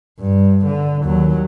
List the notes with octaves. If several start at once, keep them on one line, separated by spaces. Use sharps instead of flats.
G2
D3
D#2 F#3